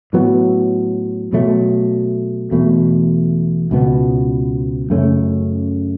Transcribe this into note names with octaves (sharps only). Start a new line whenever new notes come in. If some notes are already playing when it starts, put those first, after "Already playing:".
A2 F#3 B3
B2 F#3 A3
E2 B2 A3
C#2 B2 B3
F#2 C#3 A3 C#4